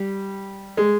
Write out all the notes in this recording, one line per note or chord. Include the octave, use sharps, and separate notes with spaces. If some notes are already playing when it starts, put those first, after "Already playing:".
Already playing: G3
G#3